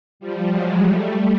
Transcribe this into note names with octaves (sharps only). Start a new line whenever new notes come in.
F3 G3
F#3 G#3
G3 A3